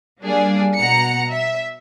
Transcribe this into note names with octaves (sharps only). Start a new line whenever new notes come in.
G3 A#3 D4 G#4 D5 F5
B2 F#5 A#5 C#7
E5